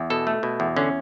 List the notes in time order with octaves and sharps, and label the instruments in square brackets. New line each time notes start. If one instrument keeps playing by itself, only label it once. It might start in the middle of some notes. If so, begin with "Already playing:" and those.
Already playing: [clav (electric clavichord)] E2
B2 A4
A3
B2
E2
D3 C#4